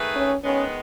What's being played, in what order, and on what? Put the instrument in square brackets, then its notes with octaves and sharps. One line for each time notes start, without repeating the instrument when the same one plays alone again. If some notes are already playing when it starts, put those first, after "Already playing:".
Already playing: [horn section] D#3 A3 D#4 G#4 B4
[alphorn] C#4
[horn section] D#3 G#3 B3 [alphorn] C#4